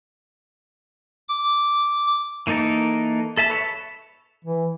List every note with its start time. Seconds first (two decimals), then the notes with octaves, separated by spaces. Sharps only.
1.29 D6
2.47 E3 A#3 D#4 A4 A#4
3.37 A4 E5 A5
3.50 B4 C#5 E5
4.45 E3